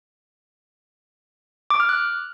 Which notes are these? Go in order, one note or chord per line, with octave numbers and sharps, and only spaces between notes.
D6
F6
F#6